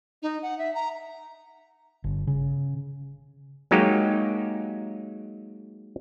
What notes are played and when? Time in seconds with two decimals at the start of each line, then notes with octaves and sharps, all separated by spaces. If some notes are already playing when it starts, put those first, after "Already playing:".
0.23 D#4
0.42 F#5
0.58 E5
0.75 A#5
2.04 G1
2.27 C#3
3.71 F#3 G#3 A#3 D#4 G4